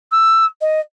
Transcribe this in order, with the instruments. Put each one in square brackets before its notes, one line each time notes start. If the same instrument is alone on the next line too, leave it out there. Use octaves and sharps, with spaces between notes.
[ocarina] E6
D#5